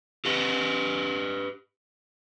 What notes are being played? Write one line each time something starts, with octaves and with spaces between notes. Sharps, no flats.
G4 B4 D#5